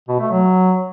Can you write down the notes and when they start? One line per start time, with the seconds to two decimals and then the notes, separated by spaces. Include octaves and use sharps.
0.09 B2
0.20 A3
0.31 F#3